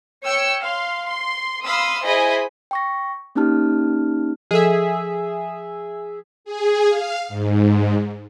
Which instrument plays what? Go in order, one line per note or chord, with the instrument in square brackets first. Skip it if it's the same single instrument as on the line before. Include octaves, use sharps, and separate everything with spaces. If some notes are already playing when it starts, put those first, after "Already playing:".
[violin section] C#5 G5 E6 C#7
F5 C6
C6
F5 B5 C6 D#6 E6
E4 G#4 C5 D#5 G#5 B5
[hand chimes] G5 C#6 A#6
A#3 C#4 D#4 G4 A5 F6
[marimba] F3 A4 [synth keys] G#4 E5
[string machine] G#4
F5
G#2